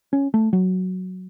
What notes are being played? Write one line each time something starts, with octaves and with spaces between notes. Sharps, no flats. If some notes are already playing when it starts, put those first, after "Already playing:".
C#4
A3
F#3